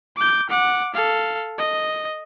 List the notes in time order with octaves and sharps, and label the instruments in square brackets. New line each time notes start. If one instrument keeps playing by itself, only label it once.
[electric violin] D6 G6
F#5 D6
A4 F5
D#5